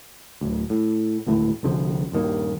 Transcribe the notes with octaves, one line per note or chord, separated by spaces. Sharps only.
D1 D2
A2
G#1 D2 A2
C2 D3 F3
D#1 G2 D#3 A#3